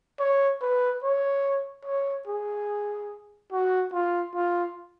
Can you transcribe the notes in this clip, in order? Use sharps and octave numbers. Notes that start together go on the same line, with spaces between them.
C#5
B4
C#5
C#5
G#4
F#4
F4
F4